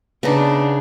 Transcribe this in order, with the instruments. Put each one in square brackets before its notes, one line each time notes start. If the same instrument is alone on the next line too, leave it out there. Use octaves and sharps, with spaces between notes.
[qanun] C#3 D#4 [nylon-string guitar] B3 [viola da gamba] D4